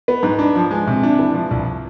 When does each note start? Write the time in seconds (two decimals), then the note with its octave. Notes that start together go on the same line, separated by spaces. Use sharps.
0.08 B3
0.23 G#2
0.39 D4
0.55 F3
0.71 G#3
0.87 C3
1.03 D4
1.19 E3
1.34 F3
1.51 C2